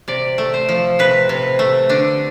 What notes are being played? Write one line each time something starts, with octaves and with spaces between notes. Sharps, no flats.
C3 D5
A3
C5
F3
C3 B4
C3
A3
D3 D4